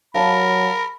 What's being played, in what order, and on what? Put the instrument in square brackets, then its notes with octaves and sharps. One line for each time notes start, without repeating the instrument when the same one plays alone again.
[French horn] F#3 [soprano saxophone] A#4 [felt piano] F5 A5 [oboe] B5